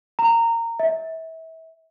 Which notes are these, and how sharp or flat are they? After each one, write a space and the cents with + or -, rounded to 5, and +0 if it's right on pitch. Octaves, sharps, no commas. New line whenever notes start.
A#5 -15
E5 -30